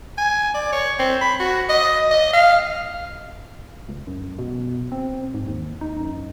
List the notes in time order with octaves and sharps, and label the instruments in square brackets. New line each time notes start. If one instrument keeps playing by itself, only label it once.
[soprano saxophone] G#5
D5
C#5
C4
B5
F#4
D#5
D#5
F5
[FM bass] C#2
F#2
B2
C4
G#2
D#2
D#4
F#2